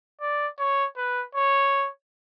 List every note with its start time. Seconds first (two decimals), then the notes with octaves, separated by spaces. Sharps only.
0.21 D5
0.59 C#5
0.97 B4
1.36 C#5